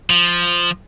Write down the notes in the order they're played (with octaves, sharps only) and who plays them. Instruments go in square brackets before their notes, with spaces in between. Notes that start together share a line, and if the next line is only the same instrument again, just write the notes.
[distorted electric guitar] F3